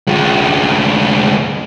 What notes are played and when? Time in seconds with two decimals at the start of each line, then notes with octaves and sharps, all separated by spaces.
0.08 D2 G#3